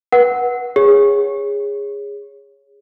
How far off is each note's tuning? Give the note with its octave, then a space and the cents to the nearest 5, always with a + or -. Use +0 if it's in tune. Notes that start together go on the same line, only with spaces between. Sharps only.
B4 -25 F#5 +0
G#4 -20 C#5 +0